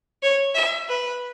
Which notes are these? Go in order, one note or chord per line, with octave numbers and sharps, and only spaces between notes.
C#5
E5
B4